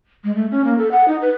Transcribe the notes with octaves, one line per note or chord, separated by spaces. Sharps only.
G#3
A3
C#4
A#3
A4
F#5
D#4
B4